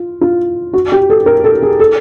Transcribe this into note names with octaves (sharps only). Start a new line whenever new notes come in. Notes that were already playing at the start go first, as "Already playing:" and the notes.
Already playing: F4
F4
F#4
G4
A4
A#4
A4
G#4
A4